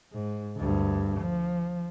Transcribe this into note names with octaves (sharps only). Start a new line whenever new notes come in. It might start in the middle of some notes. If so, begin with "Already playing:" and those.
G#2
D2 G2
F3